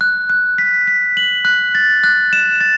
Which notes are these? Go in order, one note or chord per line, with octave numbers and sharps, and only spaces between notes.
F#6
F#6
B6
B6
F#7
F#6
A6
F#6
E7
A6